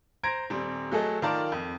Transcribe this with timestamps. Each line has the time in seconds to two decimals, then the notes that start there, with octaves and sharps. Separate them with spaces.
0.23 C5 A#5 G#6 A#6 D7
0.50 D#1 G3 C4
0.92 F#3 A3 G#4 A4 D#5
1.22 D#3 F4 A#4 D5 A5
1.52 F2